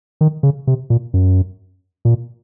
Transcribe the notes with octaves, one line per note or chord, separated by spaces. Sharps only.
D#3
C#3
C3
A#2
F#2
A#2